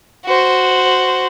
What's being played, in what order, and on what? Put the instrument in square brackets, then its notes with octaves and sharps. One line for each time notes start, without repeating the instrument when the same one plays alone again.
[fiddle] F#4 C5